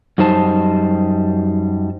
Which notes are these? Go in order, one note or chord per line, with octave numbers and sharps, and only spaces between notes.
F#2 G3 D#4 C5 A5